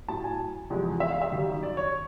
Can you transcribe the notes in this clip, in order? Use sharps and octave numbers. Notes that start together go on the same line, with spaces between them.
A2 F#3 A5
G#5
E2 C3 F3 G#3
E5
F5
E5
F#2 D#3 G3
D5
C#5